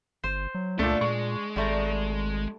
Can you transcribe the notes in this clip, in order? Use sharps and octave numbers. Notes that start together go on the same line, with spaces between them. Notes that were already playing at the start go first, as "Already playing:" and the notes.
G1 C5
F#3
C#2 A#2 A3 D4 A4
A#2 G#3 C#6
G#1 G3 A3 A#5